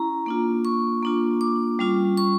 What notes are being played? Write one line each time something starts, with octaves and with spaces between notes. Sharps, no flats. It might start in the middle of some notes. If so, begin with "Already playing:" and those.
Already playing: C#4 E4 A#5
A#3 D4 F4
C#6
A#3 D4 F4
D6
G3 C#4 F4
C#6